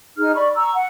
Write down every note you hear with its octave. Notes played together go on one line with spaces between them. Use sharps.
D#4 G#4 F6
D5 B5 C#6
A#5 C#6 E6
F#5